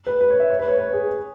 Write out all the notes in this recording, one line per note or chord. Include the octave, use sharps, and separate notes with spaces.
B4
B4
C#5
E5
C#5
B4
C#5
B4
G#4